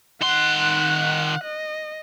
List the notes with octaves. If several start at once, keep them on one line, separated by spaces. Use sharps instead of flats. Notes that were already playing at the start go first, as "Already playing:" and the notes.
D#3 F#5 C6 F#6
D#5